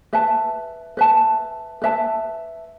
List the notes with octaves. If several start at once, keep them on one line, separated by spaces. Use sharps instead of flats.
B4 E5 A5
B4 E5 A5
B4 E5 A5